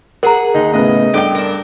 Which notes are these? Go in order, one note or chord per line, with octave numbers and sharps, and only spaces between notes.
G#4 A#4 F#5 A#5
D#2 D#4
A2 C#3 B3 D#5
G2 G4 A4 G5
D4 A#4